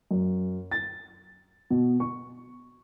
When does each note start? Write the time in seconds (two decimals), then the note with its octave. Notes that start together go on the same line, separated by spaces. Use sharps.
0.11 F#2
0.71 A6
1.70 B2
2.00 C#6